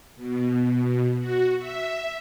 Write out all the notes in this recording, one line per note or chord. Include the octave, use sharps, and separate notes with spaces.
B2
F#4
E5